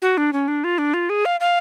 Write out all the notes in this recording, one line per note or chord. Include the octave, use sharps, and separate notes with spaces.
F#4
D4
C#4
D4
F4
D4
F4
G#4
F5
F5